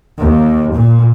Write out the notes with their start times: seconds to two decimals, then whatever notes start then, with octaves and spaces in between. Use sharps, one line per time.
0.18 D#2
0.72 A#2